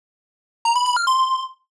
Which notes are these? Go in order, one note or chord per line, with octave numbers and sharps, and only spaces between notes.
A#5
B5
B5
F6
C6